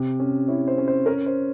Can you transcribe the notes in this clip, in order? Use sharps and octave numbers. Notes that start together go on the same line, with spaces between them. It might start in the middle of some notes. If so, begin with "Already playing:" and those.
Already playing: C3
C#4
E4 C#5
C5
C#4
C5
C#4 A#4
C5